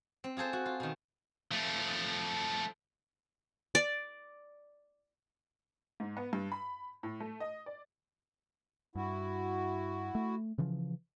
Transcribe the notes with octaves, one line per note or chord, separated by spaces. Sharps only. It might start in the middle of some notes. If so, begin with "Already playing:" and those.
C4
F4 G#4 A4 C5
F#4
F4
B2 D#3
F3 A3
D5
G#2
B3
G2
B5
A2
A3
D#5
D5
G2 E4 F#4
A3
C#3 E3 F3